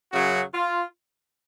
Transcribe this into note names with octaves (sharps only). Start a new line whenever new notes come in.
F#2 C#3 F#3 F#4
F4